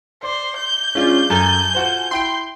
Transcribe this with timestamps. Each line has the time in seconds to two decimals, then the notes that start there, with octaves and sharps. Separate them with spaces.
0.23 C5 D5
0.57 G6
0.95 G#3 C#4 D4 F4
1.30 F#2 A4 G#5 A5
1.74 F4 F#4 C5
2.11 E4 G5 C6 D7